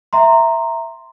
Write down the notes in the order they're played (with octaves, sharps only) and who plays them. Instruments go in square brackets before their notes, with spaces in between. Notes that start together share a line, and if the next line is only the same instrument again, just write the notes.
[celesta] E5 A#5 C6